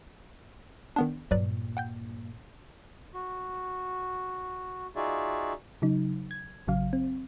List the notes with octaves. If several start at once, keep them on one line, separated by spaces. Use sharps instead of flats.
D#3 B3 D4
G2 A#2 F#3 B4 D5
F#5 G5 G6
F#4
D#4 F4 F#4 G#4 D5 E5
C#3 F#3 D#4
G#6
A1 C#3 F#3 F5
C4